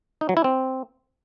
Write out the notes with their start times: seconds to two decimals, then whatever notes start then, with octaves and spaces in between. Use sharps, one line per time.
0.21 D#4
0.29 F#3
0.37 E4
0.44 C4